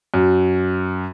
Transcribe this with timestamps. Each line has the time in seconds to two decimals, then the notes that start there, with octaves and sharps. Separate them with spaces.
0.14 F#2